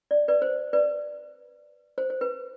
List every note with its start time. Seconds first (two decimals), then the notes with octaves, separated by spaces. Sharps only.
0.11 D5
0.28 B4 D5
0.42 C5
0.73 B4 D5
1.98 C5
2.10 C5
2.21 B4